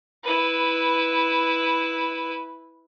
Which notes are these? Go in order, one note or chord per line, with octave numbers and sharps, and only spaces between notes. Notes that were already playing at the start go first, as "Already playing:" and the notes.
E4 B4